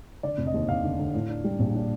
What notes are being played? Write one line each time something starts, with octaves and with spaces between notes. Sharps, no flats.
D3 D5
F1
D#5
D#2
F1 F5
D3
D3
A2
D4
G3
A#1
D4